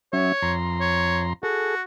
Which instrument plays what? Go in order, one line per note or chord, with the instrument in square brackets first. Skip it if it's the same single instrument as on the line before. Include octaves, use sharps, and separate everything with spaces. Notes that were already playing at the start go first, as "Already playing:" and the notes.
[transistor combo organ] F#3 C#4 E5 [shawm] C#5
[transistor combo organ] F2 A#5 C6
[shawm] C#5
[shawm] F#4 [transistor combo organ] G#4 A4